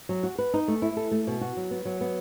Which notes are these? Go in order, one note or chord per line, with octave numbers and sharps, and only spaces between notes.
F#3
F#4
B4
D#4
A3
E4
A4
A3
B2
F#4
F#3
B3
F#3
B3